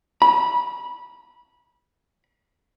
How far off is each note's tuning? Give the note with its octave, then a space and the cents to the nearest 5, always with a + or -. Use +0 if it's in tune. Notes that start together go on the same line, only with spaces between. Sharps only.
B5 -20